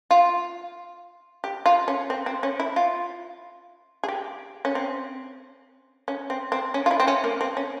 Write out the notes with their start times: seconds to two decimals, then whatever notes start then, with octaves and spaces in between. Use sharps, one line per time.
0.11 F4
1.44 G4
1.66 F4
1.88 C#4
2.10 C4
2.26 C4
2.43 C#4
2.60 E4
2.76 F4
4.04 G#4
4.08 G4
4.65 C#4
4.75 C4
6.08 C#4
6.30 C4
6.52 C4
6.74 C#4
6.86 F4
6.91 E4
7.00 C4
7.07 C#4
7.24 A#3
7.41 C4
7.57 C#4